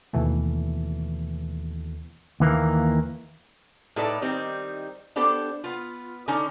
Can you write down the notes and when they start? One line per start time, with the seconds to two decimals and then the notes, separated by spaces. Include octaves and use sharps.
0.13 D#2 B2 E3 A3
2.40 D#2 E3 A#3
3.96 A2 D#4 A4 B4 D5
4.21 D#3 G3 C4 D#4
5.16 B3 D4 G4 A4 C5
5.64 B3 F4
6.28 D3 C#4 D#4